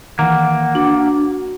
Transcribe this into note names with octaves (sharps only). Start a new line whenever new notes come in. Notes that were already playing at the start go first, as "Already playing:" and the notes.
D#3 E3 A#3 F#5
D4 F#4